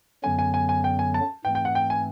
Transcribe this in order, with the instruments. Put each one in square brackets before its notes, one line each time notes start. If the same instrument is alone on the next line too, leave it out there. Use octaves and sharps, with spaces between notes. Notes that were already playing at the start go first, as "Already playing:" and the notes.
[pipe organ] F#2 D3 F#3 B3 [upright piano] G#5
[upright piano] G#5
G#5
G#5
G5
G#5
A5
[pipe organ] G#2 E3 A3 C4 [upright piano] G5
[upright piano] G5
F#5
G5
G#5